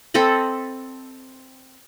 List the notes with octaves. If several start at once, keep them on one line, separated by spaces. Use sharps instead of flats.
C4 A4 D#5 B5